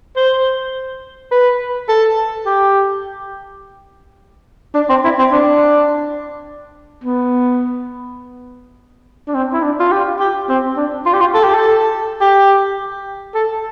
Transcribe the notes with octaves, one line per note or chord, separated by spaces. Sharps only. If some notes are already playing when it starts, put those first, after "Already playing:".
C5
B4
A4
G4
D4
C4
E4
C4
D4
B3
D4
C4
E4
D4
F4
G4
G4
C4
D4
F4
G4
F4
A4
G4
A4
G4
A4